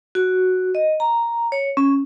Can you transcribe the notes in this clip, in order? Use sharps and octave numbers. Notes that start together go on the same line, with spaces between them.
F#4
D#5
A#5
C#5
C#4